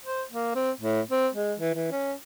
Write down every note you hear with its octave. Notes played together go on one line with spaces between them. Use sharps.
C5
A#3
C4
A2
C4
G#3
E3
E3
C#4